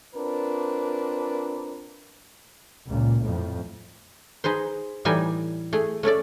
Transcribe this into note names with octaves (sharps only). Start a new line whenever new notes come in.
C4 D4 F4 A#4 B4
C#2 A#2
F2 A2
D#4 G#4 B4 C5
A2 E3 G3 D#4 G#5
A3 G#4
A3 C#4 A4 D5